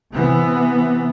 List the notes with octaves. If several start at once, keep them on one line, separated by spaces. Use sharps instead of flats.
C3 E3 B3